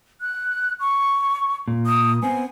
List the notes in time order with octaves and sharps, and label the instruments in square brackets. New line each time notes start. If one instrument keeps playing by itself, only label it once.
[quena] F#6
C#6
[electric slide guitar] A#2
[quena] D#6
[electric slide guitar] B3 C4 [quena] G#5